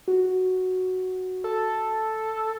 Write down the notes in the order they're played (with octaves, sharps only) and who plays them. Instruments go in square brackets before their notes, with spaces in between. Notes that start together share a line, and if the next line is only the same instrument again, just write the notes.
[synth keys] F#4
[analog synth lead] A4